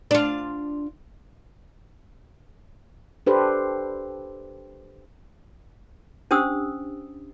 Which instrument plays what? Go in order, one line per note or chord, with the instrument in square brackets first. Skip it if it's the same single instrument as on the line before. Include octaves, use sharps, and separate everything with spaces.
[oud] D4 F4
[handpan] D4 G4 A4 B4 C5
[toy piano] C#4 D4 G4 C5 D#6 E6